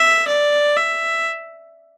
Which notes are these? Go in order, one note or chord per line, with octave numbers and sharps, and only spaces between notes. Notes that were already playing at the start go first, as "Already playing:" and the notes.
Already playing: E5
D5
E5